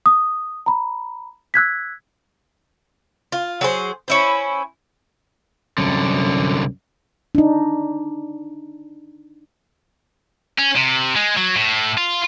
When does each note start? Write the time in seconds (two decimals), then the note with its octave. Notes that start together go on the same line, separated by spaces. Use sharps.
0.06 D#6
0.66 A#5 B5
1.54 E6 F#6 G#6 B6
3.32 F4
3.61 F#3 G#4 C5
4.08 C#4 E4 C5
5.78 C2 F#2 D3
7.35 D4 D#4
10.59 C#4
10.77 C3
11.16 G#3
11.37 F#3
11.56 A2
11.98 F4